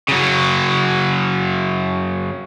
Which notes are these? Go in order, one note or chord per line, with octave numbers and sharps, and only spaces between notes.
C#3 F#3